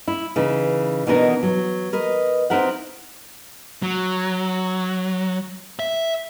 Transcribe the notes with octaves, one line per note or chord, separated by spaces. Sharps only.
E4
C#3 E3 D#4
B2 E3 B3 D4 D#4 A#4
F#3
A#4 B4 D#5
C4 D#4 E4 A#4 E5 F#5
F#3
E5